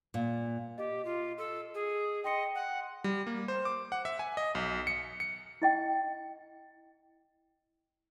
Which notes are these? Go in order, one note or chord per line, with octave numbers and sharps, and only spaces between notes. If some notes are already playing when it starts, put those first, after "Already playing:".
A#2
G4 D#5
F4
A4
G#4
D#5 G5 C6 C#7
F#5
G3
A#3
C5
D6
F#5
E5
G#5
D#5
B1
C#7
C#7
E4 D#5 G5